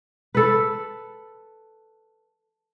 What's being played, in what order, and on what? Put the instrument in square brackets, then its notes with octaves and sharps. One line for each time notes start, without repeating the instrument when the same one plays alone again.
[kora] A4 B4